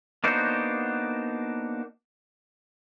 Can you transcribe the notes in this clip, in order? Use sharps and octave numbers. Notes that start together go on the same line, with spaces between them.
A#3 B3 D4 D#4 F#4 C5